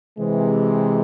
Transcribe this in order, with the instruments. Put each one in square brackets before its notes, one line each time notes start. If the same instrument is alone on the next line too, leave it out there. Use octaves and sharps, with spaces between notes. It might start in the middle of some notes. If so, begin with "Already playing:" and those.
[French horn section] C3 E3 G#3